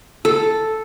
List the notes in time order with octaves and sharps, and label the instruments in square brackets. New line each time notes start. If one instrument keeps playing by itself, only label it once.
[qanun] A4